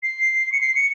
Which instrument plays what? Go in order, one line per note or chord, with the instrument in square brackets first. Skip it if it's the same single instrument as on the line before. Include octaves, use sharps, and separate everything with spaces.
[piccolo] C7
C#7
C7
C#7